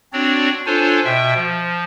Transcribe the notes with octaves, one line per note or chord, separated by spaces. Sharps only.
C4 D4 F#4 C#5 D5
D4 F4 A4 C5 C#5 G#5
B2 E5 G5
F3